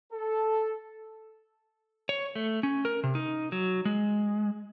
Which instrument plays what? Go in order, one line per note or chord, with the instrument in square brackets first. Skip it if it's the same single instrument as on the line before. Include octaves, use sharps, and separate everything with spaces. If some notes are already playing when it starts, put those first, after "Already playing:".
[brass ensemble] A4
[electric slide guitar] C#5
A3
C#4
A#4
C3
D#4
F#3
G#3